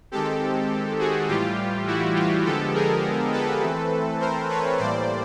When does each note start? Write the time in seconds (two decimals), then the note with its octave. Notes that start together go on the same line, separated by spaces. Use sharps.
0.11 D#3 G#3 C4 G4 A4
0.99 F#4 G#4
1.28 A2 E3 G3 F4 G4
1.87 E4 F#4
2.16 F4 G4
2.45 D3 F3 G#3 B3 G4 A4
2.74 G#4 A#4
3.33 A4 B4
3.61 E3 A3 C4
4.20 A#4 C5
4.49 B4 C#5
4.78 A2 E3 G3 A#3 C5 D5